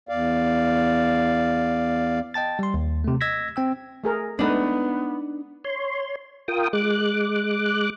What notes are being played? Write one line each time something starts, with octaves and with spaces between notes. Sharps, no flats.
E2 D5 F5
D#5 G5 A5 A6
G3 C6
D#2
C3 A3
D#5 E6 G#6 A#6 B6
C4 G5 E6
A3 G#4 A#4
G#3 A3 B3 D4 D#4 B4
C#5 C6
F4 A#4 G5 D#6
G#3 D6 F#6